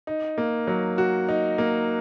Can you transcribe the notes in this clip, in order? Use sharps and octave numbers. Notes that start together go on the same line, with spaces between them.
D#4
A#3
F#3
F#4
D#4
A#3